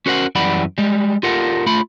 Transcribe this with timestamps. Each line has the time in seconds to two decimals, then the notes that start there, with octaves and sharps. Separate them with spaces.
0.06 C#4 F#4 A#4 C5 F5 F#5
0.35 F#2 E3 G3 D5 F#5 B5
0.78 G3 G#3
1.23 F4 G4 A4 A#4 F#5
1.66 A3 F4 B5